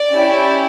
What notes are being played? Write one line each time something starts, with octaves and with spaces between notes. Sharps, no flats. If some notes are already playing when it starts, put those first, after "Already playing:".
Already playing: D5
C#4 E4 G4